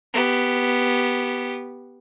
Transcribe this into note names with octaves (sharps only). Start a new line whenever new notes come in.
B3 G4